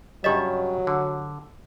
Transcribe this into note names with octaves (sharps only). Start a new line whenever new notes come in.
G2 C#3 F#3 G4 C#5 D#5 E5
D3